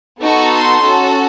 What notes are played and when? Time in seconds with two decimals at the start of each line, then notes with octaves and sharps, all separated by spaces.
0.23 B3 D#4 F#4 A4 C#6
0.53 C6
0.83 C#4 F#4 A4